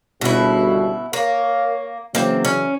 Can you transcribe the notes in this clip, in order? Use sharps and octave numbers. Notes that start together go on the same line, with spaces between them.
G1 C#2 B2 E4 F#4
A#3 A#4 C#5 F5
C#3 E3 F#3 A#3 C4
C#4